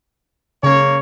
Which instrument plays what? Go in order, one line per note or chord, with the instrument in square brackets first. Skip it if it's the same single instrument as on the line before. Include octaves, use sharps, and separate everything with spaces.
[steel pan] C#3 [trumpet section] A#3 C#5